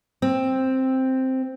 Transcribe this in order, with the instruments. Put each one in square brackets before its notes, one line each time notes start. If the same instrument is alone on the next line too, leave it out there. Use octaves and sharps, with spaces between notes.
[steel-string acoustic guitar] C4